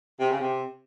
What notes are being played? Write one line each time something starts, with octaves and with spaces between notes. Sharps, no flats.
C3
C#3
C3